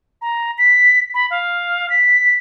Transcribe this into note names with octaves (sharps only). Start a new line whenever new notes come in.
A#5
B6
B5
F5
B6